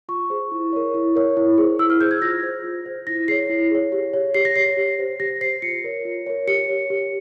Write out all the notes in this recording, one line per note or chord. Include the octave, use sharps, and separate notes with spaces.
F4 C#6
G#4 C5
E4
A#4 C#5
E4
A#4 C#5
E4
G#4 C5
E4 E6
F6
G#4 C5 G6
G#6
F4 A#6
C5
F4
C5
E4 A#6
G#4 C#5 C7
E4
G#4 C#5
G4
C#5
G4 C7
A#6
C#5 C7
G4
C5
G4 A#6
C5 C7
F4 C#7
A#4 C#5
F4
A#4 C#5
G4 C#7
C#5
G4